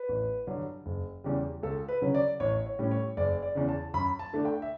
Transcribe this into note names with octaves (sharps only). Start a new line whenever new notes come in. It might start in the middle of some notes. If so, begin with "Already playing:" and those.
Already playing: B4
A1
G2 D3 F#3
F#1
E2 C#3 G3
C#2 A4
B4
C#3 F#3 C#4
D5
A1 C#5
C#5
A2 G3 C#4
C#5
F#1 D5
D5
E2 C#3
A5
F#2 B5
A5
D3 A3 D4
G5
E5